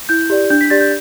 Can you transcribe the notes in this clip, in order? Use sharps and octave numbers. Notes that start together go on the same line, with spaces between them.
E4 G6
G4 D5
D4 G6
B6
G4 D5 A6
G6